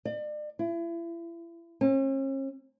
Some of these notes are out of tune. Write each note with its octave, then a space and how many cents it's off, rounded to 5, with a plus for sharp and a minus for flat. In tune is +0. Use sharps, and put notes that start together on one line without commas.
D5 +40
E4 +35
C#4 -45